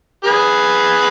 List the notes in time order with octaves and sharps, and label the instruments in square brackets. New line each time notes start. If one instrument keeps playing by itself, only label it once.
[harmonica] G#4 B4